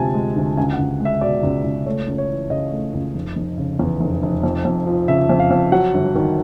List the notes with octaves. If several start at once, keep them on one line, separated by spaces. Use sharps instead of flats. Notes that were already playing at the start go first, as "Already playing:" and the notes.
Already playing: D2 C3 F3 G#3 G#5 A5
G#3
D2
C#2 G#5
F#5
C#2
G#3
E5
B2 D5
C#2
C#2
A3 C#5
C#2
C#5
E3
C#3 D#5
A3
C#2
F1
F1
C#3
E2
F1
F1
F2
F2
F3
C#3 E5
F2
F5
F2
F#3 F#5
G1
D#3